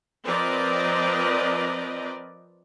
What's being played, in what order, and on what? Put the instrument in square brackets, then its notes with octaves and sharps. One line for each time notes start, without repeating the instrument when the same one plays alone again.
[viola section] F3 C4 A#4 B4 D5 D#5